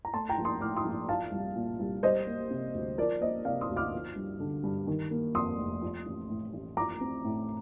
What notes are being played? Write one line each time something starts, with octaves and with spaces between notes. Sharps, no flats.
A#5
A3 A5 C6
G5 A#5
A#1
C6 D#6
A2 D6 F6
C6 D#6
A#1
F3 F5 A5
C2
A#2
C2
G3 C5 D#5
A#3
C3
D2
F3 A#4 D5
A#3 C5 D#5
C3 D5 F5
C6 D#6
D2
D6 F6
F3
G2
D3
G2
D#3
A#3
F2 C6 D#6
F1
F3
A1
A2
A1
F3 A#5 D6
C4
A2